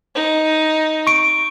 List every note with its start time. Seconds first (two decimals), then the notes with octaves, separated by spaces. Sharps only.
0.15 D#4
1.07 C#6 D7